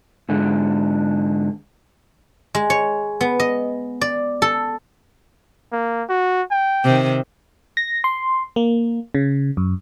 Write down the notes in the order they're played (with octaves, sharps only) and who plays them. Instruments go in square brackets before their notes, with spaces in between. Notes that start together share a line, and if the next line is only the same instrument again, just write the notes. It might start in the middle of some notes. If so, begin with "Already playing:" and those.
[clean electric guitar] G#2 D3
[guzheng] G#3
C#5
B3
D#5
D5
A4
[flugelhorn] A#3
F#4
G5
[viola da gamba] C3 D#3
[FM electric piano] A#6
C6
A#3
C#3
F#2